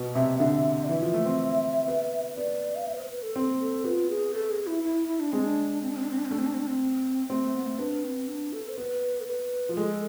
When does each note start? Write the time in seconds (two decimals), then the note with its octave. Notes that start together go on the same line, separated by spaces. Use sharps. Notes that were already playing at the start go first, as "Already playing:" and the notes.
Already playing: B2
0.15 C3 E5
0.39 D3 E5
0.84 D5
0.89 E3 E5
1.01 F3
1.14 A3
1.26 C4
1.88 B3
2.37 B3 D5
2.75 F5
2.86 E5
2.94 B4
2.99 C5
3.11 B4
3.23 A4
3.36 C4
3.60 A4
3.84 B3 F4
4.10 G#4
4.34 A4
4.50 G#4
4.67 E4
4.84 E4
5.08 E4
5.20 D4
5.32 G#3 C4
5.44 D4
5.82 C4
5.89 D4
5.96 C4
6.03 D4
6.11 C4
6.18 D4
6.25 C4
6.31 A3 D4
6.38 C4
6.46 D4
6.54 C4
6.61 D4
6.67 C4
7.30 A3 C4
7.42 A3
7.55 B3
7.67 A3
7.79 B3 D4
8.04 C4
8.28 D4
8.53 A4
8.68 C5
8.77 B3 B4
9.21 A4
9.27 B4
9.69 F3
9.77 G#3 A4